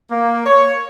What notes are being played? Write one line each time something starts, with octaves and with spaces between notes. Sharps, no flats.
A#3
C#5